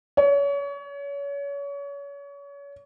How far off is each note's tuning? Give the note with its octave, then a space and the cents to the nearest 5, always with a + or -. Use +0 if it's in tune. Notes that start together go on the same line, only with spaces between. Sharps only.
C#5 +30